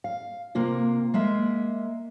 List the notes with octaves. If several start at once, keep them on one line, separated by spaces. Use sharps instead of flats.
F5
C3 A#3 F4
G#3 A#3 E5